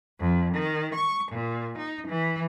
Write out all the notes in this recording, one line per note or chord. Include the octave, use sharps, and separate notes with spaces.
F2
D#3
C#6
A#2
D#4
E3